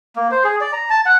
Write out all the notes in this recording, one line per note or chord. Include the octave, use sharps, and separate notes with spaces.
A#3
C5
G#4
D5
A#5
A5
F#5